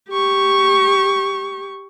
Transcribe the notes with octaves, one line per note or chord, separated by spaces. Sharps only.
G4 C#6